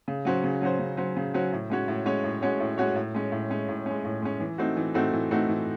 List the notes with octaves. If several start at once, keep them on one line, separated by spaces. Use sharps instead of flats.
C#3
F#3 C#4 F#4 C5
C#3
F#3 C#4 F#4 C5
C#3
F#3 C#4 F#4 C5
C#3
F#3 C#4 F#4 C5
A2
G#3 C#4 F#4 C#5
A2
G#3 C#4 F#4 C#5
A2
G#3 C#4 F#4 C#5
A2
G#3 C#4 F#4 C#5
A2
G#3 C#4
A2
G#3 C#4
A2
G#3 C#4
A2
G#3 C#4
E3
A3 C4 D#4 F#4
E3
A3 C4 D#4 F#4
E3
A3 C4 D#4 F#4
E3